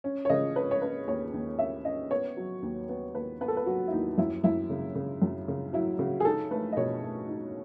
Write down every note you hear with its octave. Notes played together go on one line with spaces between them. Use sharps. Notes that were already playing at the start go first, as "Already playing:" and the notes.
C#4
C#5
C#3 D#5
C#4 B4
C#5
C#4 B4
D#2 C#5
D#2
C#4 E5
C#4 D#5
B3 C#5
F#3
D#2
B3
D#2 B4
B3 B4
A4
B4
F#3 F#4
E4
D#2 D#4
F#2 E4
F#2 E4
C#3
C#3
F#2
C#3
F#3 E4
C#3 F#4
G#4
D#4 A4
A3 B4
D#5
B2 C#5
A3
D#4